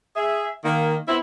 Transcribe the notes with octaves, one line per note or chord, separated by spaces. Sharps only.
G#4 E5
D#3 A#3
B3 C4 E4